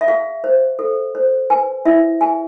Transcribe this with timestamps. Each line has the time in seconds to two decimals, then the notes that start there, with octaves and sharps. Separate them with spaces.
0.01 E5
0.08 G#4 F5
0.44 C5
0.79 A4
1.15 C5
1.50 B4 G#5
1.86 E4 E5
2.21 G#4 G#5